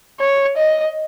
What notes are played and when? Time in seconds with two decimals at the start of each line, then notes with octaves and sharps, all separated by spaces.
0.20 C#5
0.57 D#5